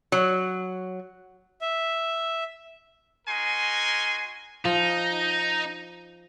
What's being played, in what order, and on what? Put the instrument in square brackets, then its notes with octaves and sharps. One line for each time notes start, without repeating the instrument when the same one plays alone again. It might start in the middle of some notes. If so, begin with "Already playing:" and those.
[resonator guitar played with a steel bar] F#3
[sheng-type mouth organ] E5
[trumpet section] D#4 F#4 A#4 G#5 C6
[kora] F3 [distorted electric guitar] D#4